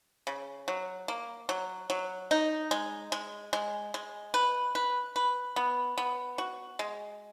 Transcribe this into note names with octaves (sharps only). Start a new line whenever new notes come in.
C#3
F#3
A#3
F#3
F#3
D#4
G#3
G#3
G#3
G#3
B4
B4
B4
B3
B3
F#4
G#3